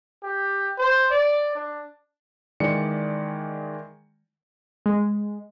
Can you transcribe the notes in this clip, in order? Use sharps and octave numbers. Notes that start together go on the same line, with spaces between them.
G4
C5
D5
D4
D#3 E3 G#3 D5 C#7
G#3